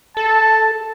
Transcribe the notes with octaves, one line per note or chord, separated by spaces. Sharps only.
A4 A5